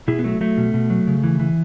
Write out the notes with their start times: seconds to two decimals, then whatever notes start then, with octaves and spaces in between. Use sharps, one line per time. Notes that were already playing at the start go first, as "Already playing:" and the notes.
0.08 B2 E4 G#4
0.19 B3
0.24 F#3 A3
0.41 F#3 A3
0.58 B2
0.74 B2
0.90 F#3
1.07 C#3
1.24 E3
1.40 E3